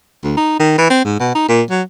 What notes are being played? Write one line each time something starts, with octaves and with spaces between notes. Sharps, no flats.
D2
D#4
D#3
E3
C4
G#2
B2
D#4
A#2
F#3